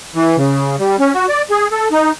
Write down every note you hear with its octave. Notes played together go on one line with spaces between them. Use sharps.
E3
C#3
G3
C#4
F#4
D5
G#4
A4
D#4